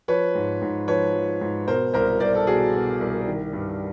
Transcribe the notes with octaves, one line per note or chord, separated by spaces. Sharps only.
F3 B4 C#5
G#2
G#2
F3 B4 C#5
F3
G#2
B2 A#4 C5
C2 A#4 C5
C2 C5 D5
A4
B2 F#4 G#4
B2
C2
D#3
G2